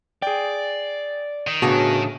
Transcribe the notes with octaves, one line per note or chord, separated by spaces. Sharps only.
G#4 D5 G5
D#3
A2 C#3 B3 D4 F#4 G#4